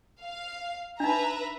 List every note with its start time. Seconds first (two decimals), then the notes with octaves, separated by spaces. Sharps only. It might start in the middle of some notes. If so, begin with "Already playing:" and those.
0.22 F5
1.00 D4 D#4 B4 E5 A#5